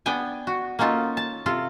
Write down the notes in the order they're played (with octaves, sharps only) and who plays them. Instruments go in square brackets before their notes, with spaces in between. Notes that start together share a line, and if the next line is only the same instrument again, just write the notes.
[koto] B3 D4 G5 G#5
F#4
A#3 C#4 D#4 F4 A4
A5
C3 F4 A4